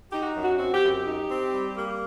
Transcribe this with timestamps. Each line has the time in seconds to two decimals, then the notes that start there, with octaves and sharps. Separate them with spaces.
0.12 D#4 G4
0.22 F#4
0.35 F#2
0.44 F#4
0.59 C4 F#4
0.74 G4
0.83 F#2
0.91 G4
1.06 D#4
1.29 C4
1.54 G3
1.77 A#3